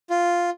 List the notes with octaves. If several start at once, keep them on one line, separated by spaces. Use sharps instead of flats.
F4